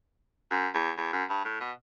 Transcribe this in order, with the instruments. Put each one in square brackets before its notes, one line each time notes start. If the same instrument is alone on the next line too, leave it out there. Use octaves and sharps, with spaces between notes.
[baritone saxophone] F#2
E2
E2
F#2
G2
A2
B2